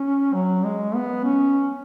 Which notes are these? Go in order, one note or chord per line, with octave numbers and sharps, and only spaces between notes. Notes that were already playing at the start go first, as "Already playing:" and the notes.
Already playing: C#4
F#3
G#3
B3
C#4